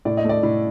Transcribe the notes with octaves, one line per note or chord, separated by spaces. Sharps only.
A2 D5
D#5
A3
D5
A2